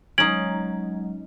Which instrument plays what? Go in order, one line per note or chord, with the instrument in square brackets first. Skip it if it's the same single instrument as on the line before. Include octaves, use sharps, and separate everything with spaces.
[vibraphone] F#3 G#3 [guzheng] C#4 D#4 [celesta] G#6 D7 F#7